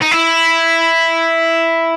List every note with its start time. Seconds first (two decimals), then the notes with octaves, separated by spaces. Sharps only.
0.02 D#4
0.11 E4